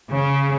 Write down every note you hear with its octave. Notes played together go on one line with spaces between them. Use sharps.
C#3